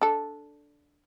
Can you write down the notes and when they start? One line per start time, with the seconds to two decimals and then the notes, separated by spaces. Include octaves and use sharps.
0.01 D4 A4